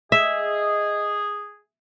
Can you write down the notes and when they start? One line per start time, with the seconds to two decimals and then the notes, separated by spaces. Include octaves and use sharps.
0.12 G#4 D#5 E5